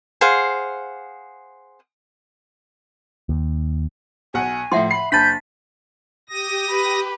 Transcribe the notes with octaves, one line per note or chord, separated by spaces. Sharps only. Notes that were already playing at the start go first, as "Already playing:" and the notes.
G#4 C5 F5 F#5
D#2
B1 F#5 G#5
A2 F3 E5 F#5 C6
B5 C7
F#1 D4 A5 B5 G6 A6 B6
G4 D#6 A#6
B4